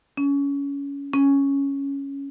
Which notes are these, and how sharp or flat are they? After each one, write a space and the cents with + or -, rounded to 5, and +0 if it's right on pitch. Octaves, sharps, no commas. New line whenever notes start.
C#4 +20
C#4 +0